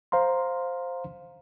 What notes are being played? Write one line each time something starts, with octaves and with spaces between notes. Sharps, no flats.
C5 F5 A#5 C6